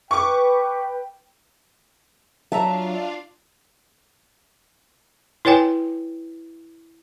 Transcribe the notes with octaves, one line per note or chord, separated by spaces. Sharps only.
B4 G5 C#6 D6
F#3 D4 F4 E5 F5 A5 A#5
E4 B4 C#5 G5 G#5